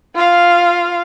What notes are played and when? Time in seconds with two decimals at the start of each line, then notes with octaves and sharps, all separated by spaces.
0.15 F4 F5